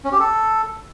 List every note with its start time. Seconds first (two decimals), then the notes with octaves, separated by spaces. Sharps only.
0.04 C#4
0.12 G4
0.20 A4